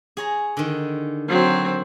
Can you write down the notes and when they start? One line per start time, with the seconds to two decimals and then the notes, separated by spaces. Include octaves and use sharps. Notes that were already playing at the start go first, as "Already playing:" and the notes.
0.17 G#4 C#5 A#5
0.57 D3 D#3
1.28 F#3 C4